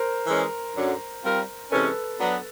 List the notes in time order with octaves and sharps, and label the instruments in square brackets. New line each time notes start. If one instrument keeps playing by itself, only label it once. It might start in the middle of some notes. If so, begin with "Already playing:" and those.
Already playing: [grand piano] A#4 C5
[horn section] E3 G#3 C#4
F#2 D3 F#3
G3 C4 F4 A#4
[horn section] C3 E3 G#3 C#4 [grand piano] A4 B4
[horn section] F#3 B3 D4